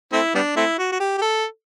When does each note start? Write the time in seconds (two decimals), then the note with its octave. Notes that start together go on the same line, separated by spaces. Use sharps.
0.13 A3 C4 E4
0.35 G3 B3 D4
0.56 A3 C4 E4
0.79 F#4
0.92 F#4
1.00 G4
1.18 G4
1.22 A4